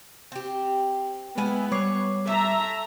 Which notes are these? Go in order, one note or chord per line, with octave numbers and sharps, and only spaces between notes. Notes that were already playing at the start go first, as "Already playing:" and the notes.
C4 G4
G#3 B3 E4 G#5
G3 C#5 D6 C7
A3 E5 A#5